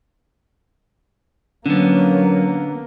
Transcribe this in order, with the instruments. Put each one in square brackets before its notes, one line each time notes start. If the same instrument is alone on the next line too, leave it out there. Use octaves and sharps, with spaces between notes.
[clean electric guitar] D3 B3 [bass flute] F#3 [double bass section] A#3 [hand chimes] C#4